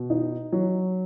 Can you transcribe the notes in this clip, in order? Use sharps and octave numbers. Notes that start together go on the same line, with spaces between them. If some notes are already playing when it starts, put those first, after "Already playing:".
Already playing: B2
D#4
F#3